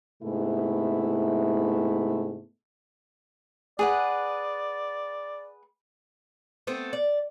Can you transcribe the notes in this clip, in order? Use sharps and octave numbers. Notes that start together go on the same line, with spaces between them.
G#2 C3 A3 B3 E4
G#4 B4 D5 F#5
A3 B3 C4 C5
D5